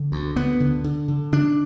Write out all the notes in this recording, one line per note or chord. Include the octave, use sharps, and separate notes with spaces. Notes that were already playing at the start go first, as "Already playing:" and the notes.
Already playing: D3
D2
D2 B3
D3
D3
D3
D3 D4